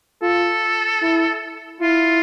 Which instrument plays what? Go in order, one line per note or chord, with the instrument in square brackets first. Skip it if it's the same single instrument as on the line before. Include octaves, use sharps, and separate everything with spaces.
[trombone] F4 [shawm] A4
[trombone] E4
[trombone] E4 [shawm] F4